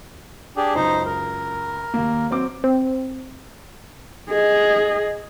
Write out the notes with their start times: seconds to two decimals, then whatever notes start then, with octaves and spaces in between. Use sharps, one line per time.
0.57 D4 G4 G#4
0.75 C#2 F#2 D#4 C5
1.06 A#4
1.94 D#2 A#3
2.31 F#3 C4 D6
2.64 C4
4.29 G#4 D#5